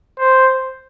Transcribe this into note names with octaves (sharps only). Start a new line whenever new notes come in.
C5